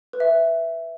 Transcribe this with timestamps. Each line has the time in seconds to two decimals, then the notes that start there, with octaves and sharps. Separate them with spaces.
0.13 B4
0.20 E5
0.27 B4